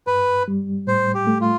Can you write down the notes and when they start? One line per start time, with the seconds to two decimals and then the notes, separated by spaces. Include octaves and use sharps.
0.07 G2 B4
0.48 G3
0.87 A2 C5
1.14 G4
1.27 A3
1.41 F4